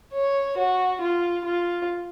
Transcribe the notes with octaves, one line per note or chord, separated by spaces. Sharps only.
C#5
F#4
F4
F4